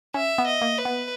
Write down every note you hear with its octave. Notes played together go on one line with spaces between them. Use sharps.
C#4 E5
B3
D#5
A#3
B4
B3